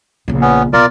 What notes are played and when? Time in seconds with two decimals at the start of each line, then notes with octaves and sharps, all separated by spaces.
0.28 A#1 C#3
0.42 B3 C#4
0.73 B1 F4 A#4 D5